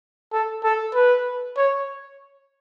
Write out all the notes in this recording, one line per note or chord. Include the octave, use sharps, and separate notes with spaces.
A4
A4
B4
C#5